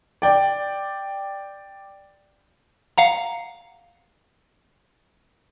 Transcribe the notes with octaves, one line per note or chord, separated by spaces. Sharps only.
D5 G5
F5 F#5 A#5